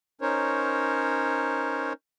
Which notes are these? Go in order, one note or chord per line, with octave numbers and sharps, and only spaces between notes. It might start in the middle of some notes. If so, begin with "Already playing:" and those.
C#4 D#4 A#4 C5 C#5